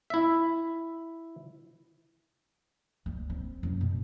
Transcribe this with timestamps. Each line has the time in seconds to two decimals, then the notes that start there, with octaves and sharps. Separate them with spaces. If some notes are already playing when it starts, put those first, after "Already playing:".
0.10 E4 E5
3.06 D2
3.30 C4
3.63 F#2
3.81 B2